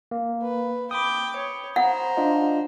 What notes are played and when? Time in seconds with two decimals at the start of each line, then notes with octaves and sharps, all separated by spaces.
0.11 A#3
0.42 B4
0.91 G5 B5 D6 D#6
1.36 C#5
1.76 C5 F#5 A#5
2.17 D4 F4 D#5